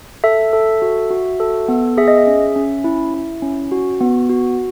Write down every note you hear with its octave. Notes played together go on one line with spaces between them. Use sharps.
A4 E5
A4
F#4
F#4
A4
B3
G#4 E5
D#5
E5
C#4
C#4
E4
E4
C#4
F#4
B3
F#4